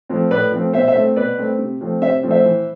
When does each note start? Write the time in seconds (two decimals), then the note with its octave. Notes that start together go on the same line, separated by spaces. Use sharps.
0.09 F3 A3 C4
0.31 A2 B4 D5
0.52 F3 A3 C4
0.73 B2 C5 E5
0.88 C5 E5
0.95 A3 C4
1.16 B2 B4 D5
1.38 A3 C4
1.59 C3
1.81 F3 A3 C4
2.02 C3 C5 E5
2.23 F3 A3 C4
2.30 C5 E5
2.44 E3